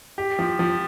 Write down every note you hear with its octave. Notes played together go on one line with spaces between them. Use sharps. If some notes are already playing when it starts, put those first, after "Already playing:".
G4
F3
F3